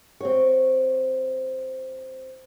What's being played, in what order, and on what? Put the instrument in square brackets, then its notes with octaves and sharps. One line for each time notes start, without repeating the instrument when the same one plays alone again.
[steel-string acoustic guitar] C4 F#4 C#5